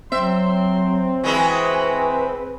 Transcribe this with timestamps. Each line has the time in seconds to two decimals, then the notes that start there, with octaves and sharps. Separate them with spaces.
0.12 F#3 C4 E5 C6
1.24 E3 G#3 E4 F#4 B4